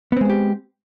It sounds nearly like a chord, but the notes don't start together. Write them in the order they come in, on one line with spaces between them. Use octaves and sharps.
B3 C4 G#3 C5 G4